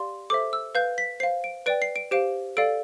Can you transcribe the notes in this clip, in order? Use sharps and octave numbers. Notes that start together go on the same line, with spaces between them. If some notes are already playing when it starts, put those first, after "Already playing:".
Already playing: G4 D5 F5 C6
A4 C5 E5 D6
E6
B4 F5 G6
B6
C5 F5 C7
D7
B4 D5 G5 D7
C7
D7
G4 C5 F5 D7
A4 D5 F5 D7